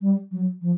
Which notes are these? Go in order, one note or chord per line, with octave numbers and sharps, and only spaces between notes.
G3
F#3
F3